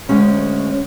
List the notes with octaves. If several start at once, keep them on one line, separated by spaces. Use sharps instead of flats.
D2 G#3 C#4